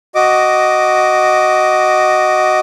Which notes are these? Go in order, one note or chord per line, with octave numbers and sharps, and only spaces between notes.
F#4 D#5 D6